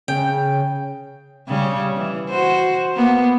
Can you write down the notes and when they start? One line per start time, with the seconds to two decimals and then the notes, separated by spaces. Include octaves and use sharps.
0.08 C#3 G5
1.48 C#3 G3 C#4
1.96 E3
2.29 F#4 C5
2.94 A#3 B3